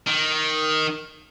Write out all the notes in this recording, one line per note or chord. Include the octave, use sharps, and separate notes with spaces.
D#3